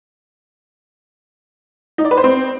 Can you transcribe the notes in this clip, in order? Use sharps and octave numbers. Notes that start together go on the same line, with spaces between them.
D#4
D5
B4
C5
C4